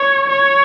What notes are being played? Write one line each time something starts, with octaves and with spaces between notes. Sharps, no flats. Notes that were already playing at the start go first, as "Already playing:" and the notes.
Already playing: C#5
C#5